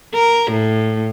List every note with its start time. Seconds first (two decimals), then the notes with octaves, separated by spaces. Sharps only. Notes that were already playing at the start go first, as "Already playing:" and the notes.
0.14 A#4
0.51 A2